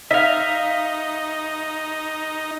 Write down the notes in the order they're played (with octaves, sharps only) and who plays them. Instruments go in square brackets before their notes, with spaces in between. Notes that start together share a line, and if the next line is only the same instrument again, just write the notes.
[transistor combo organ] D#4 [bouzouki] E5 F5